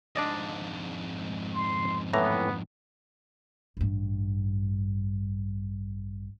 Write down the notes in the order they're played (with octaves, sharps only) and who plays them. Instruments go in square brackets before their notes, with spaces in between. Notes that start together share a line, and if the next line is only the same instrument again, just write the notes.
[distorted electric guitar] F2 G#2 [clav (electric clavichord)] D4 D5 D#5
[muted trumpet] C6
[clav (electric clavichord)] A2 E3 A#5 [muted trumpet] B3
[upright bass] A1 G2